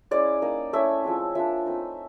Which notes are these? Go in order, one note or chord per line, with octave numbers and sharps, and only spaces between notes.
G#3 C#4 E4 D5
A#3 D#4
A3 C#4 E4 E5
F3 G#3 C4
F3 A#3 D4 E5
A3 C4 D#4